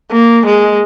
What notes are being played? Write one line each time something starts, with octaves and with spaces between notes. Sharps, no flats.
A#3
G#3